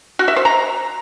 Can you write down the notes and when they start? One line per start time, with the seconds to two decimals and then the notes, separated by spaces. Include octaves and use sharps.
0.19 F#4
0.28 E5
0.36 C5
0.45 A#5